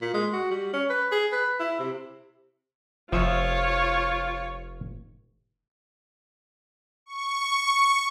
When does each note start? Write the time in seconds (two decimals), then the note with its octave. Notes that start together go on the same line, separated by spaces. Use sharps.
0.02 A#2
0.14 G#3
0.33 F#4
0.51 G3
0.74 C#4
0.90 B4
1.12 G#4
1.32 B4
1.60 E4
1.80 C3
3.12 F1 F3 F4 C#5 E5
7.06 C#6